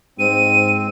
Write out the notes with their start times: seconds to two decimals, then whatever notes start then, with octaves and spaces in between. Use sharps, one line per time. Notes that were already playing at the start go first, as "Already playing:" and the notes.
0.19 G#2 C4 D#7